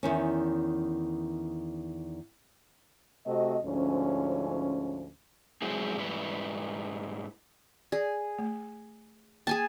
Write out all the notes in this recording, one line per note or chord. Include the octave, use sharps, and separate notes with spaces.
E2 D#3 C#4
C3 A3 C4 F#4 D#5
D2 G#2 F3 C#4
F#3 G#3 C4 E4 G#4
G#2 G3 E4 B4
G#4 D5
A3
A#3 G#4 G#5 A5